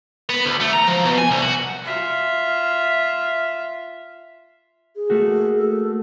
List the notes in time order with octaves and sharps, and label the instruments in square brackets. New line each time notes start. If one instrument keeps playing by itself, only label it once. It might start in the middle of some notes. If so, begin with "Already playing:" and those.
[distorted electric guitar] B3
D2
A3
A#5
F3
B2
G#5
C2
F#4
[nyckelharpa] F4 E5
[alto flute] G#4
[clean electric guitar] A3 A#3 F#4
[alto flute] A4